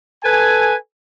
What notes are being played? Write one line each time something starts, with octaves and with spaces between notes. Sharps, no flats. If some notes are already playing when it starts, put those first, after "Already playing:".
A4 B4 G#5